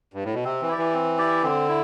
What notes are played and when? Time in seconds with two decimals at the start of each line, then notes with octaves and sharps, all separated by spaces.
0.14 G2
0.24 A2
0.34 B2
0.44 C3 C4
0.62 E3
0.69 E4 G4 D5
0.78 E3
0.94 C4
1.18 E4 G4 D5
1.43 D3 C4
1.69 E4